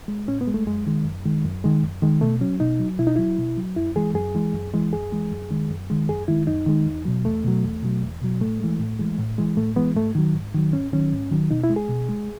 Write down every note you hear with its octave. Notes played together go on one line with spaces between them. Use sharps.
G#3
A2 C#4
B3
G#3
A3
F#2 G#3
D#3 G#3
F#2
D#3 G#3
F#2
D#3 G#3
F#2
D#3 G#3
B2 A3
F#3 C#4
B2 D#4
F#3
B2 E4
D#4
F#3 E4
B2
F#3
F#2 E4
E3 G#3 G#4
F#2 G#4
E3 G#3
F#2
E3 G#3
F#2 G#4
E3 G#3
F#2
D#3 G#3
F#2
D#3 G#3
F#2 G#4
D#3 G#3 E4
F#2 D#4
D#3 G#3
E2
B2 F#3
E2 A3
B2 F#3
E2
B2 F#3
E2
B2 F#3
A2 A3
E3 G#3
A2
E3 G#3
A2
E3 G#3
A2 A3
E3 G#3 B3
G#2 A3
D#3 F#3
G#2
D#3 F#3
G#2 C#4
D#3 F#3 C#4
G#2
D#3 F#3
B2 D#4
E4
G#3
G#4
B2
G#3